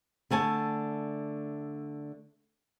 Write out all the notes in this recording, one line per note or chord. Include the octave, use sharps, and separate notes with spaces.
D3 A3 G#5 A5